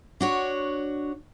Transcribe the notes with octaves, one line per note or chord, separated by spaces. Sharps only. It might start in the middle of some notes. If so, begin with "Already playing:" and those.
D4 F#4 C#5